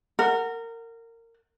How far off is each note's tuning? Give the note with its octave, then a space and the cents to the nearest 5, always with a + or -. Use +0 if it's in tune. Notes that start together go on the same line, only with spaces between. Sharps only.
A#4 -25 F#5 +0